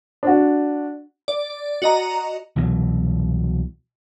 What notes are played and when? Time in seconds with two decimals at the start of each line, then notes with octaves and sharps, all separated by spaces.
0.23 D4 F#4
1.28 D5
1.82 F#4 D#5 A#5
2.56 C2 B2 E3 F#3